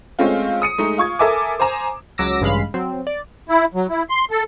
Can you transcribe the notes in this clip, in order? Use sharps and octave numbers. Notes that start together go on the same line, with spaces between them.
G#3 A3 C4 C#4 F4
D#6 C#7 D#7
G#3 A3 D#4
F4 C#6 G#6
A4 A#4 E5 G#5 D6
C5 G#5 A#5 E7
C#2 F#3 D6 E6 A#6
A1 G2 C#3 G#3 F5 B5
F#3 C4
D5
E4
F#3
E4
C6
A4